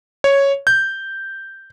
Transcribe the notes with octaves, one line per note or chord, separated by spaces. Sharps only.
C#5
G6